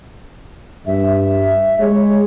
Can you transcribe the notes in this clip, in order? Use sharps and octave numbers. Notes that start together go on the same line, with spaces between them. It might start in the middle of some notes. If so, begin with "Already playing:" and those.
G2 E5
G#3 C#5